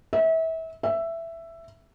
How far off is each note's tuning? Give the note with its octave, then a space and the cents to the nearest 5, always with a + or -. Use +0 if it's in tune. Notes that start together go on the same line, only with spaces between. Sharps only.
E5 -30
E5 +10